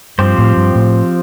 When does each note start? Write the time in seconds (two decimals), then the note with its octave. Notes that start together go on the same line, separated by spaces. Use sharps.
0.18 G2 F3 C4 G4 C5
0.38 A2
0.57 G2
0.75 A2